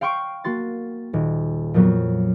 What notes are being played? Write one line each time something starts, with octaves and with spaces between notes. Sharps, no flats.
F5 G5 C6 C#6 D7
A#3 F#4 C6 A6
D#1
F2 A#2 F#3 B3